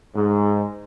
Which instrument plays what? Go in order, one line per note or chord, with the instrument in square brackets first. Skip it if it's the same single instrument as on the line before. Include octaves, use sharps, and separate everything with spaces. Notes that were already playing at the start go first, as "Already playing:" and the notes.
[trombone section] G#2